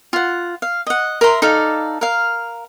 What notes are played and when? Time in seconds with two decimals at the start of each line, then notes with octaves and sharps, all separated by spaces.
0.13 F4 F#5
0.62 F5
0.87 D#5 F#5
1.21 A#4 E5 A#5 C6
1.42 D#4 A4 D5 F5
2.01 A#4 F5